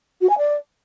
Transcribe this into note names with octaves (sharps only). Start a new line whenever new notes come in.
F#4
G#5
D5